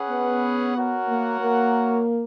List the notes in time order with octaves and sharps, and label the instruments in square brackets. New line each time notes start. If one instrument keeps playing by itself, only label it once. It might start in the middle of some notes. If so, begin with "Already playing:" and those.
Already playing: [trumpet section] C#4 G#4 B4 F#5
[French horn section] B3
[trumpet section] F#4 A#4 C#5 F#5
[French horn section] A#3
A#3